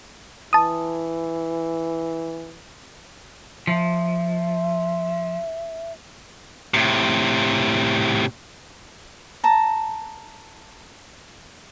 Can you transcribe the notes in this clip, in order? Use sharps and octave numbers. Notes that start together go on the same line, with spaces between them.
E3 A5 D#6
F3 E5
A2 C3
A5 A#5